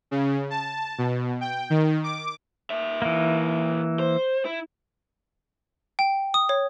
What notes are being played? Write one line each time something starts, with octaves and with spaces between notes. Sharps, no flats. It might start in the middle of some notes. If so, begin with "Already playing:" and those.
C#3
A5
B2
G5
D#3
D6
A#2 E5
E3 A#3
C5
E4
G5
D#6
C#5